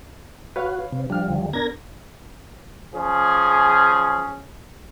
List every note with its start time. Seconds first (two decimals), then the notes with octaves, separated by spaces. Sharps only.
0.56 F#4 B4 C#5 F5
0.92 C3
1.10 F3 G3 D4 F6
1.28 D#2 D3
1.53 B3 D4 A#4 G#6 A#6
2.95 F3 C#4 G#4